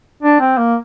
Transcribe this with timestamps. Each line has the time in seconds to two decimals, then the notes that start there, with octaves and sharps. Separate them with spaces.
0.23 D4
0.40 C4
0.57 A#3